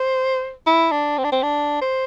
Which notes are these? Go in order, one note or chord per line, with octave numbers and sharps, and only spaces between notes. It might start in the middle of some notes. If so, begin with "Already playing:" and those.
Already playing: C5
E4
D4
C4
D4
C4
D4
C5